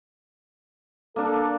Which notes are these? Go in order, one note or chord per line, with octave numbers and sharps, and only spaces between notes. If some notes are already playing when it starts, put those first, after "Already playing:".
A#3 D4 A4